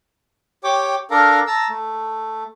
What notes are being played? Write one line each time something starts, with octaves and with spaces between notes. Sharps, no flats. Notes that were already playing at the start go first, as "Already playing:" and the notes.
G4 C#5 G5 D6
D4 A4 A#4 F5 A#5
A5 A#5 E6
A3